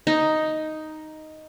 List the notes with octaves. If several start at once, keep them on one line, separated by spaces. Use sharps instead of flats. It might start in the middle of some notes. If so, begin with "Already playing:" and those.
D#4